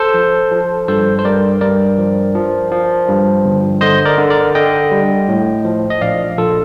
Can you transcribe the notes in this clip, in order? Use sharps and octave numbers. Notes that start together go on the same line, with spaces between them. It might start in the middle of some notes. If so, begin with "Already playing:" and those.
Already playing: A4 C5
F3
F3
G2 A4 C5
C5
G2 A#4 D5
G2 A#4 D5
F3
F3
F3
G2
G1
D3 C5 D#5
A#4 D5
D3
A#4 D5
D3 D#5 G5
G3
A2
F3
D#5
A#1 D5 F5
A#1 F4 A4